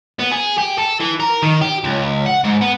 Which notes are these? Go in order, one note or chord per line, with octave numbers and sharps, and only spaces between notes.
B3
G#4
G4
A4
E3
A#4
D#3
G4
C#2
F#5
G#2
B3